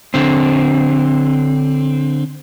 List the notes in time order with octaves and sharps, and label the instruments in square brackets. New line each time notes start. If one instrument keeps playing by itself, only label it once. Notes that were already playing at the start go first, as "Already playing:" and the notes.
[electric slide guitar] D3 C4